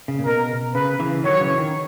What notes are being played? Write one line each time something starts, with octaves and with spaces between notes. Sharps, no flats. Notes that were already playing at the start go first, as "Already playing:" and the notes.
C#3
A#2
B2 A#4
C#3 B4
C#3 E3
D#3 F#3 C#5
C#3 E3
D#3